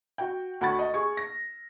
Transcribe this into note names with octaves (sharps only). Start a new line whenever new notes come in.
F#4 G5
D2 F#4 F#5 B5 C#6 A6
D#5
G#4 C#6
A#6